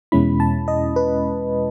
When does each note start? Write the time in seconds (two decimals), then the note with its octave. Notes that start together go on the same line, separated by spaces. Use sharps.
0.12 E2 B2 G#3 C#4 E4 B5
0.40 A5
0.68 D#5
0.96 B4